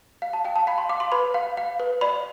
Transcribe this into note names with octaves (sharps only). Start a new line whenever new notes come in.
F5
A5
F5 G5
A5
F5 B5
C6
F5 D6
C6
B4 B5
F5
F5
B4
D5 B5